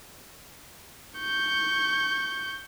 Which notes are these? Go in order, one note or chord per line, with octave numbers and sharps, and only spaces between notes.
C#6 G6